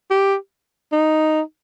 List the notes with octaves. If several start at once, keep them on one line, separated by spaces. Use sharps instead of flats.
G4
D#4